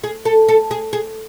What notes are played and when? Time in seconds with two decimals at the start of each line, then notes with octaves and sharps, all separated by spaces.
0.04 G#4
0.25 A4
0.48 A4
0.71 G#4
0.93 G#4